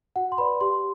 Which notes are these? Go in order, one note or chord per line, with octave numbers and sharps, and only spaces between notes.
F#4 F#5
C6
B4 D5 B5
G4 C6